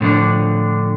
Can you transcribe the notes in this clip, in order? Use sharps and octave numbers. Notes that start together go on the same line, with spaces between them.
A2 D3 F3 D4